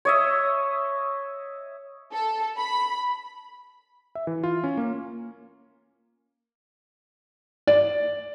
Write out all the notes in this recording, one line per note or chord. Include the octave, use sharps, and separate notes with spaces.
C#5 D#5 E5
A4
B5
E5
E3
F4
C#4
A#3
D5